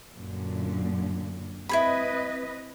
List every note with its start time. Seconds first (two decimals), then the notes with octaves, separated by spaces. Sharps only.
0.16 F#2 A#2 D3
1.69 C4 E4 G#4 B4 D#5 B5